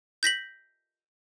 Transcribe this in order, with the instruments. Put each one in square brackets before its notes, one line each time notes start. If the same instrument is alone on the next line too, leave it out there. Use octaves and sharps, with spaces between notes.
[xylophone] G6 A#6 B6 F#7